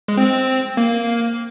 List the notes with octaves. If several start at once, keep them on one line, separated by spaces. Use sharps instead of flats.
G#3
C4
A#3